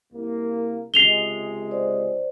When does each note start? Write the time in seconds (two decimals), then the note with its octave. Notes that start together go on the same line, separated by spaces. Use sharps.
0.13 C2 A#3
0.94 C#2 C3 G#3 C7 F7 G7
1.71 C5 D5